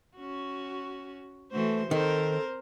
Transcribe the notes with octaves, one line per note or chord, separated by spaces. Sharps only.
C#4 F#4
E3 A3 F#4 C5
D#3 C4 A4 A#4 C5